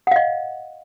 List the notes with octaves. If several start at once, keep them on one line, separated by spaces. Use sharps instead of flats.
D#5 F5 F#5